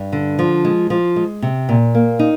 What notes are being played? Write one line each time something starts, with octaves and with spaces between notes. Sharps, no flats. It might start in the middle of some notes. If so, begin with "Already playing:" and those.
Already playing: G2
D3
F3
G#3
F3
G#3
C3
A#2
A#3
D#4